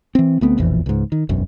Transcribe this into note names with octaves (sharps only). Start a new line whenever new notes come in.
E3 C4
D2 A3 B3 C4
E1 A#1 F2 E3
C#2 G#2
D#3
E1 B1 F#2